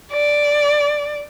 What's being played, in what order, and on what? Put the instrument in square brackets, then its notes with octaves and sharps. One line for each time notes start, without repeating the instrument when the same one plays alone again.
[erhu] D5